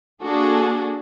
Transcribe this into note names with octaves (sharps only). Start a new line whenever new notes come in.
A#3 D4 F#4 G#4 A4